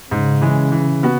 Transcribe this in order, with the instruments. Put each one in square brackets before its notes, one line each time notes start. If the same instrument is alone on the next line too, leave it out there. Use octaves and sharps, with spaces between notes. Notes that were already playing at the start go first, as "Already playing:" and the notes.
[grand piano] G#2 [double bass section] C#3
[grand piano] E3 G#3
E3
B3 F#4